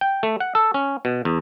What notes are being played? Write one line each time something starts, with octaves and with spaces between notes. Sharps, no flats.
G5
A3
F#5
A4
C#4
B2
E2